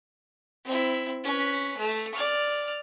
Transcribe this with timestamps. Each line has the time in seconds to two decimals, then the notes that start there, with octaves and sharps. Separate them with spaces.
0.65 C4 E4
1.24 C#4 B4
1.77 A3
2.14 D5 F6